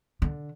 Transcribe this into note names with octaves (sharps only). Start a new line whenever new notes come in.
D3